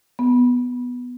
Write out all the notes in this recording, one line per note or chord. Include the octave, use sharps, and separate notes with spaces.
B3